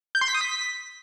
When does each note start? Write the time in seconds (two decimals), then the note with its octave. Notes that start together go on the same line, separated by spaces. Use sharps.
0.15 G6
0.21 C6
0.28 B6
0.35 D#6
0.41 B6